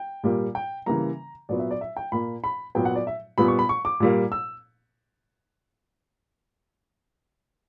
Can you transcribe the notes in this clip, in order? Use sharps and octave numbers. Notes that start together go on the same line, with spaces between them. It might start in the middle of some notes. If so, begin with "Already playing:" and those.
Already playing: G5
A#2 G3 A#3
G5
C#3 E3 G3 A#3 A#5
A#2 F#3 B3 D5
E5
D5
E5
G5
A#2 A#3 B5
B5
A#2 F#3 B3 G5
F#5
D5
E5
A#2 G3 B3 B5
C#6
B5
C#6
D6
A#2 G3 A#3
E6